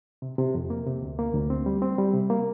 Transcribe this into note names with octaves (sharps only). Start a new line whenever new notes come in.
C3
C3
F2
A#3
C3
D2
A#3
D2
C4
G3
C4
G3
C3
A#3